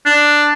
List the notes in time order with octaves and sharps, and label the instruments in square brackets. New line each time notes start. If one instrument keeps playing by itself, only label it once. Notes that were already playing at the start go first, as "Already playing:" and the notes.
[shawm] D4